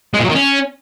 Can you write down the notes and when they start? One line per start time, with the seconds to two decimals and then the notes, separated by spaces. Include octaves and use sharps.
0.14 G#3
0.19 A#2
0.24 F#3
0.29 D#3
0.35 C#4